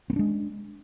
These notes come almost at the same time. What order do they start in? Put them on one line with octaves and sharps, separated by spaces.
C4 A#3 D4 G#3